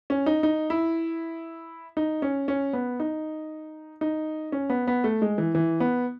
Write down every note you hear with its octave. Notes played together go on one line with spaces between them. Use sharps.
C#4
D#4
D#4
E4
D#4
C#4
C#4
B3
D#4
D#4
C#4
B3
B3
A3
G#3
E3
E3
B3